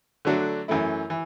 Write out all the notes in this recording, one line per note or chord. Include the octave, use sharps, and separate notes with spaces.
D3 F#3 A3 D4 F#4
F#2 E3 A3 E4
E3